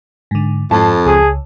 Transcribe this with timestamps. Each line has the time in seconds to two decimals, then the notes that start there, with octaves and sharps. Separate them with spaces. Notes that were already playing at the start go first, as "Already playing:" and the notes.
0.31 G#2 D3
0.71 F2 G#2 C4 A5
1.06 C#2 G#4